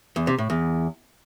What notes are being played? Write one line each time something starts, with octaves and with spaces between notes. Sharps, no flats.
E2
C3
A2
E2